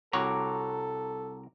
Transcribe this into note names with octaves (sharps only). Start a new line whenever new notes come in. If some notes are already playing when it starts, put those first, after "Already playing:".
C2 F#4 A4 C#5 A#5 D6